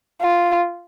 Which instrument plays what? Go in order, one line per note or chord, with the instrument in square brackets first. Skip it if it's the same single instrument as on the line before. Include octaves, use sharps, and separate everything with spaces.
[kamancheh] F4